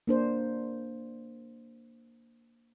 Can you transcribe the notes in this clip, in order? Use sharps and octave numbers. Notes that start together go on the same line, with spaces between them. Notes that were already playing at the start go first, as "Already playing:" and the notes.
A#3 D4 C5